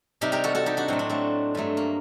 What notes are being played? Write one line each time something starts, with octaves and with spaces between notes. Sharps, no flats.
C3 G3 D#4 G4
G4 A#4
F#4 A4
F#4 A4
D#4 G4
D4 F#4
A2 F#3 A3 C4
D4
A3 C4
G2 F#3 A3
A#3